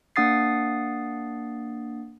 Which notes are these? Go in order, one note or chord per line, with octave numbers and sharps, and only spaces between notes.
A#3 D4 F#5 D#6 A6 C7